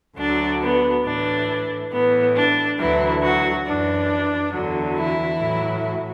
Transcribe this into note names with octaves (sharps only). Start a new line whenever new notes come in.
D2 D3 F#3 D4
B3
A2 E3 D4
A2 E3 B3
D4
D2 D3 E3 F#3 E4
F#3 F#4
F#2 E3 D4
E2 D3 F#3
E3 E4
A2 F#3